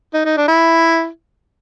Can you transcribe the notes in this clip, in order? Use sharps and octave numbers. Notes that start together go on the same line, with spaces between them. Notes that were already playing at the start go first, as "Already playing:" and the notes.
D#4
D#4
D4
E4